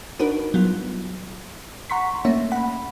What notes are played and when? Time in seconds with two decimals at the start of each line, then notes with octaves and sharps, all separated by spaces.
0.19 D4 D#4 F#4 A#4 B4
0.54 F#3 G3 B3 F4
1.90 F#5 A#5 C6 C#6 B6
2.25 A3 A#3 C#4 C#5 E5
2.51 F#5 B5